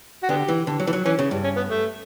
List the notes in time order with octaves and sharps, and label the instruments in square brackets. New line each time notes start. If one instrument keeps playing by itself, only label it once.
[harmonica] F#4
[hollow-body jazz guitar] D3 [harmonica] B3 G4
[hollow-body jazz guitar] E3
D3
F#3
E3
F#3
[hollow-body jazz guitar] E3 [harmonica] C#4
[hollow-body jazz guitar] C#3
G2
[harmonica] C#4
B3
A3